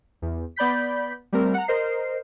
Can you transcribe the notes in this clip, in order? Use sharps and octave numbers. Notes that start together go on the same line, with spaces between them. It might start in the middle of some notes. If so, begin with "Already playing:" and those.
E2
B3 D5 B5 G6 B6
G3 A3 C4 A#4
F#5 A#5
A#4 C5 D#5 C7